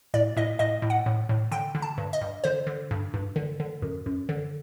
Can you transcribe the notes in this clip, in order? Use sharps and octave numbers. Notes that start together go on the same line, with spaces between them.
A2 D5
A2 D#5
A2 D#5
A2
F#5
A2
A2
D3 G5
D3
A5
G2
D#5
G2
D3 C5
D3
G2
G2
D3
D3
F#2
F#2
D3